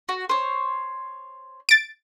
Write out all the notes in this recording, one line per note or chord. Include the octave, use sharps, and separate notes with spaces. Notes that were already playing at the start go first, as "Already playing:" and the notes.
F#4
C5 C#5
A6 D7